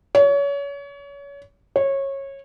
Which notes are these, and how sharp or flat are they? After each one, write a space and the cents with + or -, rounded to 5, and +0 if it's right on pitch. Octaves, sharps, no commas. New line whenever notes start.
C#5 +30
C#5 -20